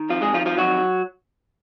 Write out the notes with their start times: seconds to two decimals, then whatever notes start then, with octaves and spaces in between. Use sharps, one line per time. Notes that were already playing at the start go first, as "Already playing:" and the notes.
Already playing: D#3
0.09 F2 F3 F4
0.22 G#3 G#4
0.34 D#3 F3 F4
0.46 F3 F4
0.58 F2 F#3 F#4